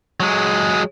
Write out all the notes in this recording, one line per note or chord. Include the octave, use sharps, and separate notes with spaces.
F#3 G#3